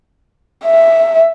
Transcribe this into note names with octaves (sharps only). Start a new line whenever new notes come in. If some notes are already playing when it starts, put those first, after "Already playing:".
E5